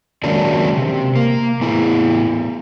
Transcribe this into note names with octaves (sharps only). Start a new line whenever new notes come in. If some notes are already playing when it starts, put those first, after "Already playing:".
D#3 F#3 G#3 A#3 C#4 D4
C3
A#3
A2 B3 E4